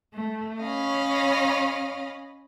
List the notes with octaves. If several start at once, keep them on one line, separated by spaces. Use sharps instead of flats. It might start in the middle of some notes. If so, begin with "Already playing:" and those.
A3
C#4 C#5 D#5 F5 B5